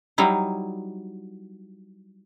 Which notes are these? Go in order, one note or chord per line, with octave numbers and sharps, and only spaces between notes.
F#3 G3 D#4 E4